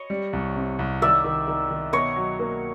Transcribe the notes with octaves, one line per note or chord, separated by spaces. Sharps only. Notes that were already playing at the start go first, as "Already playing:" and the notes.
Already playing: C#5 D#5
G3
C2
C3
C2
D#3 D5 E5
D#3
D#3
D#3
B2 C#5 D#5
F#3
A#3